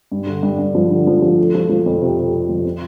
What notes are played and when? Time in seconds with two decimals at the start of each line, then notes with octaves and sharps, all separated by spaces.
0.12 G2
0.27 D3
0.43 G2
0.59 G2
0.75 F3
0.90 D3
1.07 F3
1.22 F3
1.38 A3
1.55 F3
1.69 F3
1.86 F2
2.02 C3
2.17 C3
2.33 C3
2.49 F2
2.65 C4